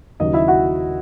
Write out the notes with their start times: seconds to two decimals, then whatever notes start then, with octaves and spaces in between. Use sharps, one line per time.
0.20 D#2 C#3 F#3 D#4 D#5
0.33 E4 E5
0.48 F#4 F#5